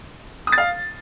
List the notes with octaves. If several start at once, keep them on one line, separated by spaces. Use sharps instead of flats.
D#6
A6
F5